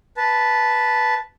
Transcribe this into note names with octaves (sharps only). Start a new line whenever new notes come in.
B4 A5